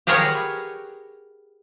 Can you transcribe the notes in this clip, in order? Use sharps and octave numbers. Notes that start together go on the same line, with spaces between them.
G4 G#4 A#4 B4 C#5 F#5